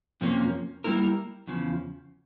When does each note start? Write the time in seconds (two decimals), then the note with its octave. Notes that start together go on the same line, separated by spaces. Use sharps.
0.21 F2 C3 F3 A#3 C#4
0.84 G3 A#3 E4 A#4
1.47 E2 C#3 F3